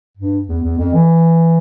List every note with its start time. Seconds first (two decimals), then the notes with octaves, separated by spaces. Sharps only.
0.17 G2
0.48 E2
0.63 E2
0.78 F2
0.93 E3